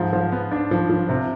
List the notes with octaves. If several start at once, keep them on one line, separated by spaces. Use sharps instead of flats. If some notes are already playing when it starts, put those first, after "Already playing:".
Already playing: G#2 F3
F3
B3
D4
F3
F3
C3